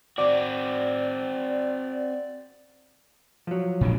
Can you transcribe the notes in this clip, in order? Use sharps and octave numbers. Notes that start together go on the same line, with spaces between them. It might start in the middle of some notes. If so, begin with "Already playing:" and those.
C4 F#4 D5
F3 F#3
A#2 G#3 D4